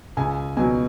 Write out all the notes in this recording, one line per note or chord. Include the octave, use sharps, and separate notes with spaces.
C#2 G#5
B2 F#3 G#5